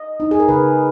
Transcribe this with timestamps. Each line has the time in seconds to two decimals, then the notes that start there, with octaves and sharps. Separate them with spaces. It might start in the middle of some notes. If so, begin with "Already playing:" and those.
Already playing: D#5
0.20 D#4
0.31 G#4
0.40 A#4
0.48 C#3 B4